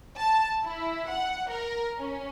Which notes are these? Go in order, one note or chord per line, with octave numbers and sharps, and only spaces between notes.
A5
E4
F#5
A#4
C#4